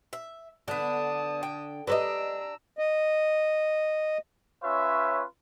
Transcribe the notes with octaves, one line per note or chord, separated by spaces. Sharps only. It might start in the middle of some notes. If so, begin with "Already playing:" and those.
E5
D3 B3 D4 A5 D#6
G5
D4 G4 B4 C5 D#5 A#5 E6
D#5
C#4 F4 B4 C#5 E5